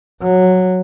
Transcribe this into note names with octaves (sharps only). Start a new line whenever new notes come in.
F#3